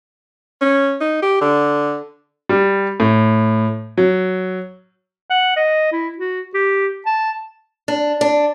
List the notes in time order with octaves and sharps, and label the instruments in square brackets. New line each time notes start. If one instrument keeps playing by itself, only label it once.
[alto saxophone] C#4
D#4
G4
D3
[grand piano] G3
A2
F#3
[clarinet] F#5
D#5
E4
F#4
G4
A5
[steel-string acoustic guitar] D4
D4